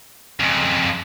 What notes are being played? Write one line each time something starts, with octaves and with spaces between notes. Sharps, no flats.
F2 C#3